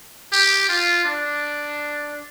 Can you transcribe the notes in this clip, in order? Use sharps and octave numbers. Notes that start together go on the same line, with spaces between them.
G4
F4
D4